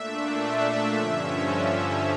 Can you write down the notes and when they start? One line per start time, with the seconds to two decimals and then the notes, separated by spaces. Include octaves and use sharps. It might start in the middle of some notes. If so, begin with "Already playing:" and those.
Already playing: A#2 A3 D4 E5
0.42 E5
0.94 G2 D3 F3 C#4